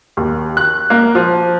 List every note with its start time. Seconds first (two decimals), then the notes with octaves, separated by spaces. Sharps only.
0.17 D#2
0.57 F#6
0.90 A#3
1.15 F3